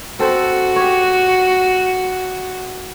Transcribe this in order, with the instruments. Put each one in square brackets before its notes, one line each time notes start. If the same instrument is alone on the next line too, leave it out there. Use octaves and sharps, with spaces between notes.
[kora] C4 A4 C5 [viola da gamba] F#4
[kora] G4 C#5